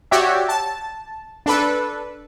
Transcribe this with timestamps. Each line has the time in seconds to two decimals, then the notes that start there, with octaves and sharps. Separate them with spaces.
0.11 F#4 G4 C#5 D5 E5
0.49 A5
1.46 D4 A4 B4